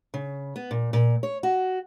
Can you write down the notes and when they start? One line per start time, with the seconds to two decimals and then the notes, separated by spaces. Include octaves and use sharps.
0.14 C#3
0.56 B3
0.71 A#2
0.93 A#2
1.23 C#5
1.43 F#4